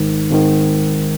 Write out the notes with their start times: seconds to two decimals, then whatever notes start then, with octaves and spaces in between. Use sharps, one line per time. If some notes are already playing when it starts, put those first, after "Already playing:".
Already playing: G#1 G#2 D#3
0.30 G#1 G#2 D#3